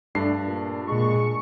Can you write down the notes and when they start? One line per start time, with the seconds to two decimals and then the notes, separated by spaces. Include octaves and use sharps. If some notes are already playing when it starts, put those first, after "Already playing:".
0.15 G2 A3 D4 C7
0.45 A#2
0.87 A#2 G#3 C#6